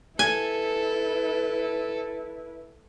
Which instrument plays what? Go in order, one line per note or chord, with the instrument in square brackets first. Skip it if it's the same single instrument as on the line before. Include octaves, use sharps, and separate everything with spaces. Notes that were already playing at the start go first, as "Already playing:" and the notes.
[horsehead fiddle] E4 B4 [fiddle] A4 [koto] G#5